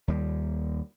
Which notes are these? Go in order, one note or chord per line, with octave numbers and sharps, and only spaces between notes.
D#2 G3